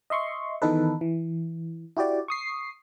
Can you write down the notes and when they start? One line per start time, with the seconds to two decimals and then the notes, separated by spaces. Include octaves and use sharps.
0.10 D#5 E5 C6 C#6
0.62 D#3 E3 B3 D#4 A4 B4
1.01 E3
1.97 E4 F#4 G4 D5
2.28 C#6 D#6 C7